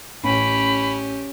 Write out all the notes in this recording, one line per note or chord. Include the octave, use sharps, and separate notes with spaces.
A1 C#4 G4 B5